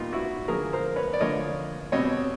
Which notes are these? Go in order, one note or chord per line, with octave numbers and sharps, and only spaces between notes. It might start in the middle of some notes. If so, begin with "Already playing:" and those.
Already playing: A#2 G3 B3 D#4 F4
E4 F#4
D3 F3 A#3 G#4 A#4
A#4 C5
B4 C#5
D5
D3 F3 A#3 C#5 D#5
B2 G3 C4 C#5 D#5